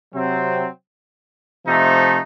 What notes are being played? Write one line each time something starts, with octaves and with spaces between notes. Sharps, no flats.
C3 F#3 C4
C3 F3 A3 D#4